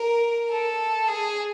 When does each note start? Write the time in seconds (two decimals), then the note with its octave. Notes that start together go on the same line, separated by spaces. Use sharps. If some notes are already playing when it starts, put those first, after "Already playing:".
Already playing: A#4
0.51 A4
1.08 G#4